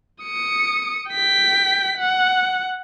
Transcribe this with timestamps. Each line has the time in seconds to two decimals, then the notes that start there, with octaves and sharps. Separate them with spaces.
0.23 D#6 C#7
1.11 G5 B6
1.97 F#5